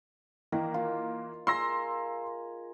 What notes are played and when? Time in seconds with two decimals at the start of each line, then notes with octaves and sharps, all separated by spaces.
0.52 D#3 E3 A#3
0.74 F4
1.47 F4 G#4 A#4 C6 E6 A#6